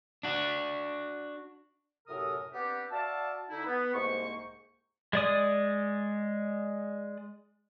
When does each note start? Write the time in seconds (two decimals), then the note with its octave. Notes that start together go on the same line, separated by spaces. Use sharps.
0.23 D4 F#4
2.08 F#2 A2 C3 A4 A#4 D#6
2.53 B3 C4 D4 G4
2.92 F#4 D5 E5 F5 A5
3.50 D3 D#4 E4
3.65 B3
3.93 C2 G#2 A#3 C5 C#6
5.13 G#3 D5 D#6